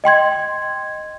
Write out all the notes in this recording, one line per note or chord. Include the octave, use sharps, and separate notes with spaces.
D#5 G5 C6 G#6